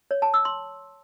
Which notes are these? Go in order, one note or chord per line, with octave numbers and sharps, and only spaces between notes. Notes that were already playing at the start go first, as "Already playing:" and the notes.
C#5
A5
E6
C6